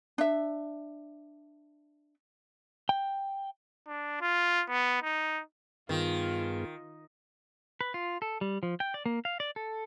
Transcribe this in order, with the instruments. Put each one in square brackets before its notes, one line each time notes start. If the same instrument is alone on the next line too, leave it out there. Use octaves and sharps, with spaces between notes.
[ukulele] D4 E5
[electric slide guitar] G5
[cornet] D4
F4
B3
D#4
[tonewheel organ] G2 B3 G#4 [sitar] D#3 [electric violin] F4
[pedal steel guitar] B4
F4
A4
G3
F3
G5
D5
A#3
F5
D5
A4